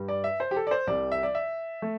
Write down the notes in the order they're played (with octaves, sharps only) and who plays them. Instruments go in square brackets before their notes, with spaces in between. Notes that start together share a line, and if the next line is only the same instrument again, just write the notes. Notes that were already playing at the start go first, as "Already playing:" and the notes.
Already playing: [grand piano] G2 G3
D5
E5
C5
G4
A4
D5
C5
C2 C3 G3 D5
E5
D5
E5
A3